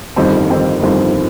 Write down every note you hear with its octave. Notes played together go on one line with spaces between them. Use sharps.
G1 F2 D#3 G3 C4
G1 F2 D#3 G3 C4
G1 F2 D#3 G3 C4